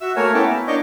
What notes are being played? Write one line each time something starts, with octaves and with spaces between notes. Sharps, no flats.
F#4 E5 E6
A3 A#3 A#4 C#5 G#5
A#3 B3 C#4 E4 G5 A5
E4
A#3 D4 C#5 D#5 D6 G6